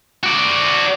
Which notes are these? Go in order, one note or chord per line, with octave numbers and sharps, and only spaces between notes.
F#4 D5